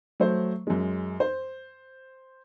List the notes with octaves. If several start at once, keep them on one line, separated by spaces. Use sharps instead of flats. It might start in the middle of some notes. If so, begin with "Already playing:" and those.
F#3 A3 C5
F#2 G#3
C5